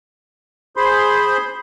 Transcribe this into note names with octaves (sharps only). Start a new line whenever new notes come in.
G#4 C5 B5 C6